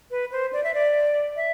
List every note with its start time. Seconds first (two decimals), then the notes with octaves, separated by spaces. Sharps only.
0.11 B4
0.32 C5
0.53 D5
0.64 E5
0.74 D5
1.36 E5